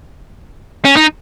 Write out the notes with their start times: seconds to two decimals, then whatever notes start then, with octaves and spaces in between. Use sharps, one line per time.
0.85 C#4
0.97 D#4